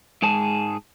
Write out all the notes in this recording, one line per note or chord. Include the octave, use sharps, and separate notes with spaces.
G#2 G#3 G#4 A5